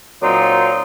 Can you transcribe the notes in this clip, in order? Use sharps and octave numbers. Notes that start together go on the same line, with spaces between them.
A#2 F#3 C4 D#4 F4